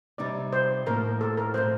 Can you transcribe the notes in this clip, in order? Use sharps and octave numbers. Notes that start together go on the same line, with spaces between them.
C3 G3 C4 D#4 D5
C5
A2 F3 A#3 A#4
A4
A#4
A2 A3 C4 C5